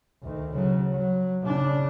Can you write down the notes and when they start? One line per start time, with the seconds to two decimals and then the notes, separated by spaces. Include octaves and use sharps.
0.22 D2 D#3
0.52 C#3 F#3
0.93 F#3
1.43 C#3 D4